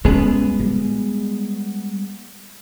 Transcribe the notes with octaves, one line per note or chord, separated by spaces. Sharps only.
G3 G#3 B3 C#4 G#4
G3